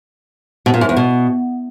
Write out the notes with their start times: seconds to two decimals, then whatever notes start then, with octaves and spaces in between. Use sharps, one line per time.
0.66 B2
0.74 A#2
0.81 F#2
0.89 E2
0.97 B2